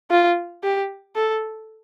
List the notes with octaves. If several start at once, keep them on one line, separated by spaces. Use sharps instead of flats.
F4
G4
A4